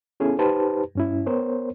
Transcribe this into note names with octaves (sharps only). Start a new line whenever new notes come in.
B3 C#4 E4 G#4 A4
D#4 G4 B4 C5 A5
G2 C#4 E4
B3 A#4 C5 C#5